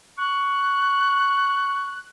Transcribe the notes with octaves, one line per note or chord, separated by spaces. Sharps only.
C#6 F#6